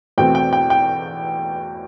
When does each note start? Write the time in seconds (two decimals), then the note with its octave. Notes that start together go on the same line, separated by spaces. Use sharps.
0.18 E2 B2 A3 C4 G5
0.35 G5
0.53 G5
0.70 G5